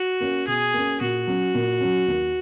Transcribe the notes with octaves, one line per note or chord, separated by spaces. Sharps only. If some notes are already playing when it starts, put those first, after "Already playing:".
Already playing: F#4
A#3 C#4
B2 G#4
A#3 C#4
A#2 F#4
F#3 C#4
A#2
F#3 C#4
D#2